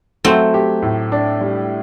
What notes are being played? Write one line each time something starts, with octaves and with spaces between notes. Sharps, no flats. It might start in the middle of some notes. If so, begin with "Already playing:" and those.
F#3 A3 C4
G4
A2
D4
G3